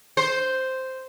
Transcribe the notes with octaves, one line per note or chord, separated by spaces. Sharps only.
C5